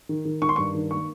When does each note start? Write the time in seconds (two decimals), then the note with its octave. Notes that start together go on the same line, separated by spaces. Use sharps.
0.09 D#3
0.25 D#3
0.42 D#3 C#6
0.49 C6
0.56 G2 C#6
0.75 D#3
0.91 A#3 C#6